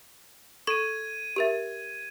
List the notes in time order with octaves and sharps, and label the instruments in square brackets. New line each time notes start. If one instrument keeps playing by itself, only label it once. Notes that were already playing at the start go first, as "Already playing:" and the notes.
[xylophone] A4 C#6 [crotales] G#6 D7 D#7
[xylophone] G4 A#4 E5